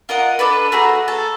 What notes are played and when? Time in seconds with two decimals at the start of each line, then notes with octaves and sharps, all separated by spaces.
0.09 F4 A#4 D#5 F#5
0.39 D4 A4 B4
0.72 A3 F#4 G#4 A#5
1.08 A4 A5